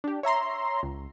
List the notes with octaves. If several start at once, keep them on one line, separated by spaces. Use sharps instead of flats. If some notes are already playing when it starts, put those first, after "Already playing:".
D4 G4
C#5 E5 A#5 C6
C#2